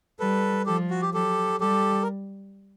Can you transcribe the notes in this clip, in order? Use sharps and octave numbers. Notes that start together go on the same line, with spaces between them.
G3 A4 B4
F3 G4 A4
F#4
G4
F#3 G4 A4
G3 G4 A4
A#4